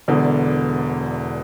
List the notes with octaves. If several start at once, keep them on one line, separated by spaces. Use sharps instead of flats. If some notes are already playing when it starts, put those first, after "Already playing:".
E1 E2 D3